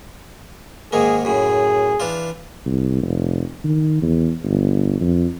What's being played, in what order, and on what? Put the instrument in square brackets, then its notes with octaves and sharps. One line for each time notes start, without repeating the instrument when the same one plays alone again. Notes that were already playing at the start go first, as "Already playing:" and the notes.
[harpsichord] G#2 D#3 A#3 [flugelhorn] G#4
[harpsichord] F#2 A2 [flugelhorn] G#4
[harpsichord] E3 D4 F4
[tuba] C2
F1
D#3
E2
G1
F2